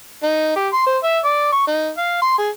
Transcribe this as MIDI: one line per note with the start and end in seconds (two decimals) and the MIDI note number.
0.23 0.55 63
0.56 0.68 67
0.73 0.85 84
0.86 0.97 72
1.03 1.18 76
1.24 1.51 74
1.52 1.63 85
1.67 1.90 63
1.97 2.19 77
2.22 2.35 84
2.38 2.49 68